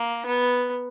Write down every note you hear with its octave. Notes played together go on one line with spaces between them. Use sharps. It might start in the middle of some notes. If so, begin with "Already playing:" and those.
Already playing: A#3
B3